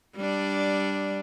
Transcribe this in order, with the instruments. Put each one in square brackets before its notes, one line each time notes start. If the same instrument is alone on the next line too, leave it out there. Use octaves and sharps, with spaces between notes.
[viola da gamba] G3 D4